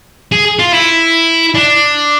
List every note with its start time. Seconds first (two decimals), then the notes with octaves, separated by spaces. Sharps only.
0.32 G#4
0.59 F4
0.72 E4
1.54 D4